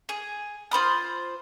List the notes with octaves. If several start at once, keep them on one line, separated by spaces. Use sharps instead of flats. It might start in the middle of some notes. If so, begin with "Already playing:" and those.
G#4
F4 C5 B5 D#6